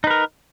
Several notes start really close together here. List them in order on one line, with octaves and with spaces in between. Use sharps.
D#4 B4 A#4